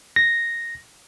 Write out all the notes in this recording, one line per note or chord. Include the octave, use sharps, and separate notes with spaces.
A#6